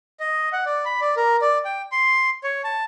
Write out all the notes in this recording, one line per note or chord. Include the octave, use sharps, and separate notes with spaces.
D#5
F#5
D5
B5
D5
A#4
D5
G5
C6
C#5
A5